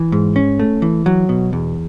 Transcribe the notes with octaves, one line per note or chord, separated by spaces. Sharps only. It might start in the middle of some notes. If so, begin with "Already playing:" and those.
Already playing: E3
G#2
C#4
A3
E3
F#3
B2
E2